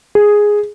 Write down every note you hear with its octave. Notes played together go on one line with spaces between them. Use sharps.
G#4